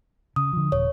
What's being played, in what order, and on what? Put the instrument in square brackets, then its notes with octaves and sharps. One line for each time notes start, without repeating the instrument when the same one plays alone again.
[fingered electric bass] C#3 [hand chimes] D#6
[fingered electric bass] D3 F3
[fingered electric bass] D#1 [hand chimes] C#5